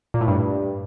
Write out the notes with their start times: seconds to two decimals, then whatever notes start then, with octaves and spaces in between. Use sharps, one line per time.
0.14 A#2
0.21 A2
0.28 G2